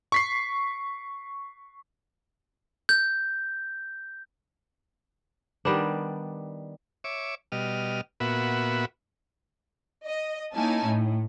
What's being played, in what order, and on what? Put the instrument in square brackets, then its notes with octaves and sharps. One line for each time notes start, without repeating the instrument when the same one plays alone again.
[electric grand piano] C#6 B6 C7
[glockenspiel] G6
[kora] D#3 G3 B3 D4
[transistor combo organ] C#5 E5 D6
B2 G3 D#5 F6
A#2 B3 F#4 E5 B5
[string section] D#5
A#3 C#4 D#4 E4 G#5 A5
A2